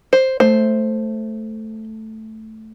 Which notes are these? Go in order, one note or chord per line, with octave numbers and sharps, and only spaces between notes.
C5
A3 C5